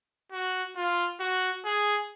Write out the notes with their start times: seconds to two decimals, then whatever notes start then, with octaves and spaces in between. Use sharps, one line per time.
0.32 F#4
0.76 F4
1.20 F#4
1.65 G#4